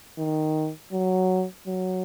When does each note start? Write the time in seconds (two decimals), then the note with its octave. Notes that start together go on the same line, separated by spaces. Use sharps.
0.18 D#3
0.93 F#3
1.67 F#3